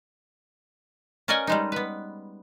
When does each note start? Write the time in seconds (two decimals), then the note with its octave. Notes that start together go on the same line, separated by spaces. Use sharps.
1.28 C#4 A#4 D5 D#5 F#5 G#5
1.47 G3 G#3 D#4
1.72 B3 B4